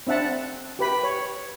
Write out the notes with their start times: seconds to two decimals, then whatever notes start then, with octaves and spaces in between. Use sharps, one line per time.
0.07 C4 D4 E5 F#5 A5
0.79 G4 B4 B5
1.04 C#5